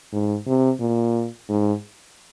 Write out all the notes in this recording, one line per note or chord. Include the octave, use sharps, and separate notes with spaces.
G#2
C3
A#2
G#2